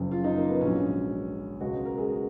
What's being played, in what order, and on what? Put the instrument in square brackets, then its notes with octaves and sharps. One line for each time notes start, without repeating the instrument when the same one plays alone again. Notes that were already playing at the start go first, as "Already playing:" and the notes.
Already playing: [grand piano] F#1 F#2 C#3 F3
F4
D#4
A#3
B3
A#1 G#2 F#3 C#4
C#2 B2 G#3 F#4
A#4
G#4
F#4